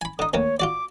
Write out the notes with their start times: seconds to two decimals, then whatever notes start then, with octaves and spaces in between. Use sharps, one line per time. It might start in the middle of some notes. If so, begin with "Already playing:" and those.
0.01 G#5 B5
0.19 D3 D#4 D#6
0.33 D2 D#3 A#3 C#5
0.60 F4 F#4 D5 D6